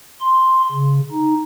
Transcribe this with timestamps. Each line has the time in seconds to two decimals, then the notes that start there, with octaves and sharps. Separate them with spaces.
0.21 C6
0.72 C#3
1.12 D#4